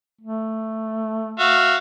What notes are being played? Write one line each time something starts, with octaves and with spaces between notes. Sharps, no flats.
A3
F#4 E5 F5